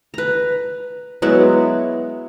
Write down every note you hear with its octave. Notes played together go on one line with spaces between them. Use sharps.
B4 A#5
F#3 G#3 B3 E4